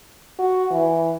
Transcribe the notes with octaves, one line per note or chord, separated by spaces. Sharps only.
F#4
E3